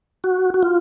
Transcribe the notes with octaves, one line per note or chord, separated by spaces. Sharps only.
F#4
F#4
F4